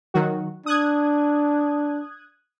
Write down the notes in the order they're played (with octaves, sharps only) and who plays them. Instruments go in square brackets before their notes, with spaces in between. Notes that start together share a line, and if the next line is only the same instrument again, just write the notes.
[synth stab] D#3 F#3 F#4
[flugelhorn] D4 [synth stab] D#6 F#6 G#6